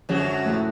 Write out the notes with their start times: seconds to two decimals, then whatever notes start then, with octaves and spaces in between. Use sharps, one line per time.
0.09 F#2 D3 F3 F#3 G#3 C#4
0.44 A2 F3 A3